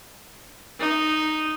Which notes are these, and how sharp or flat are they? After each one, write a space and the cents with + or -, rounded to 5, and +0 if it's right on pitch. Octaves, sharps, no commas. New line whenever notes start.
D#4 -5